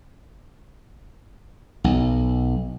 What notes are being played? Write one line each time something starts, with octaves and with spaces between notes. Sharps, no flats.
B1